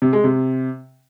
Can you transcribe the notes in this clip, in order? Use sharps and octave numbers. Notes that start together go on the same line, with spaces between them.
C3
G#3
C3